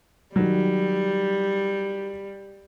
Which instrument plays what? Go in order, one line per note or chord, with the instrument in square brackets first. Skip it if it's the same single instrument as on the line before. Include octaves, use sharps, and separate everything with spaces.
[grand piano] D#3 F#3 [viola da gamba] G3